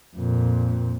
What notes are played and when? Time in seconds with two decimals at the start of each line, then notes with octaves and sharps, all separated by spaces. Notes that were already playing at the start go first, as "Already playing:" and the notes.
0.16 F2 A#2